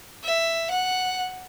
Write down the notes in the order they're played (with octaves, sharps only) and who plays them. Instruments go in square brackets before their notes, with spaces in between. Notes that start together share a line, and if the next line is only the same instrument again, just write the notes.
[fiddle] E5
F#5